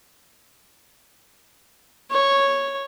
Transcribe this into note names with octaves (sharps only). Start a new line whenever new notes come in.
C#5